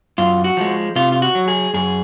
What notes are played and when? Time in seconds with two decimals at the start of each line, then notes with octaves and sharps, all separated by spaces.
0.18 F#2 F4
0.44 F#4
0.57 F3 G#3
0.96 C3 F4
1.12 F4
1.22 F#4
1.35 F#3
1.48 G#4
1.74 F#2 G#4